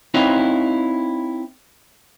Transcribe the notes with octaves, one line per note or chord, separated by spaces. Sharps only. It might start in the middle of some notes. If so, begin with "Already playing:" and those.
C4 D#4 E4 B4 C#5 F5